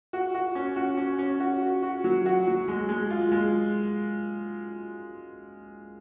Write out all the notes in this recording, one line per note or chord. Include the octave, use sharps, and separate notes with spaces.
F#4
F#4
C#4
F#4
C#4
C#4
F#4
F#4
F#4
F#3
F#4
F#3
G#3
G#3
F4
G#3